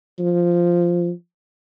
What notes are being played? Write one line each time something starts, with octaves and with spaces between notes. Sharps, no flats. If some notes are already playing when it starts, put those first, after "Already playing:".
F3